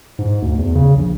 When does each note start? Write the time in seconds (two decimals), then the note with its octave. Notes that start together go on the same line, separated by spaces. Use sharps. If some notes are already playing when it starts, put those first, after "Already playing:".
0.19 G#2
0.42 D2
0.58 E2
0.75 C#3
0.95 A#1